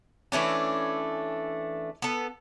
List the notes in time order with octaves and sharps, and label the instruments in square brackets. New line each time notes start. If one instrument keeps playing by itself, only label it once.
[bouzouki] E3 A3 C#4 D4
B3 A4